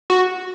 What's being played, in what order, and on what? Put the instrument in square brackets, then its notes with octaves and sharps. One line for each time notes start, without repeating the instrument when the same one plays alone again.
[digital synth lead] F#4